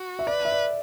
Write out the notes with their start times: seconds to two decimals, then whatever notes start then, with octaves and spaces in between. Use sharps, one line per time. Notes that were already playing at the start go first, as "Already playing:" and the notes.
Already playing: F#4
0.19 E5
0.27 B4 D5
0.45 E5
0.52 D5